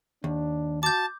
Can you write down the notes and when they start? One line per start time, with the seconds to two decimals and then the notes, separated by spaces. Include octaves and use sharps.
0.24 D#2 D4
0.83 F#4 A5 D6 G6